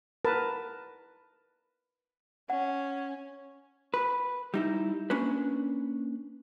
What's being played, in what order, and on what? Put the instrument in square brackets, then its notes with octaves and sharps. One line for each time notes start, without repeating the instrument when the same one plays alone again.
[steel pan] A#4 B4 A5
[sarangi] C#4 [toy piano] F#5
[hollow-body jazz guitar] B4
G3 D#4 E4
A#3 C#4 D4 B4